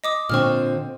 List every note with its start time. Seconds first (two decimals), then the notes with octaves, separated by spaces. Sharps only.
0.04 D#5 D6 D#6
0.30 A#2 D3 C4 C#6 F6